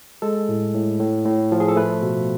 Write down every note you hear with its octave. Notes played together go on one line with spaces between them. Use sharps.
G#3 A4
A2
A2
A2
A2
F3
G#4
A4
A3 B4
B2